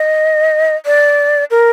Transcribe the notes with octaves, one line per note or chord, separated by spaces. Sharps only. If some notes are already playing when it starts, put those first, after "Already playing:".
Already playing: D#5
D5
A#4